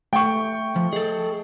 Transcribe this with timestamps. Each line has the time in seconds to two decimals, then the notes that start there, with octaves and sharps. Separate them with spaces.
0.13 A3 G5 C#6
0.76 F3
0.93 G#4 A4 D#5